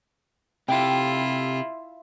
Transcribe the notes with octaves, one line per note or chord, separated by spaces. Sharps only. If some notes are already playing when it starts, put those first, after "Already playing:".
C3 E4 F4 G4 A4 G5